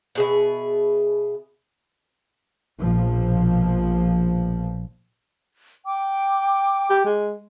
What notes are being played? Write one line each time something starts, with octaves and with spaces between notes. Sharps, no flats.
B2 G#4 E5
A#1 B2 F3
G5 D6
G4
G#3